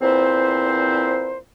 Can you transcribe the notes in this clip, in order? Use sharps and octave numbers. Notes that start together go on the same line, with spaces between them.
E2 A#2 C4 E4 C5